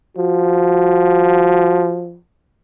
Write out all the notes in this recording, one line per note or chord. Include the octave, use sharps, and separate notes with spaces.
F3 F#4